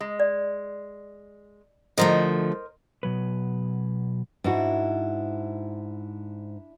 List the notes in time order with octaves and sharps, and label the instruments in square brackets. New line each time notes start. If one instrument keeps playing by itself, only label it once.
[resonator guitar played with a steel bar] G#3
[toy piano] D5
[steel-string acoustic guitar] D3 F3 A3 [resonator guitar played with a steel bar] A#4 C5 D#5
[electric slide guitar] B2 F#3 B4
[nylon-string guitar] G#2 F#4 [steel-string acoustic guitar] D4 E4